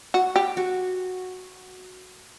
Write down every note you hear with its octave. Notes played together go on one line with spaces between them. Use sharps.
F#4
G4
F#4